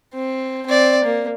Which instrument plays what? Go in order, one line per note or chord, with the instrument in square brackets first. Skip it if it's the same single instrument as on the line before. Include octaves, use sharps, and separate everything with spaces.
[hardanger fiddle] C4
C4 D5
A#3